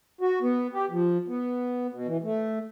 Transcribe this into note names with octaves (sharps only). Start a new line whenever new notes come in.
F#4
B3
G4
F3
B3
B2
E3
A3